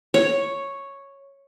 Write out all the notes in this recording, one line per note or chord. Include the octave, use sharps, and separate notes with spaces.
C#5